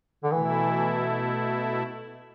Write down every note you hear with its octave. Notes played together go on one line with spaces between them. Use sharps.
D3
B2 E3 A3 E4